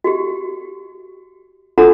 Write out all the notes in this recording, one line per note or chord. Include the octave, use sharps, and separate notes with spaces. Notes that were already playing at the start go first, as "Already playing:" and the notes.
F#4 G4
D4 F4 F#4 A4 F#5 A#5